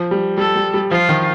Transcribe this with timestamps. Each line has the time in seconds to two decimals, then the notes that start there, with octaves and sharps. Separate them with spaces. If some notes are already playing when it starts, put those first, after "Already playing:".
Already playing: F3
0.11 G3
0.38 G3 A4
0.56 G3
0.74 G3
0.91 F3 F4
1.09 D#3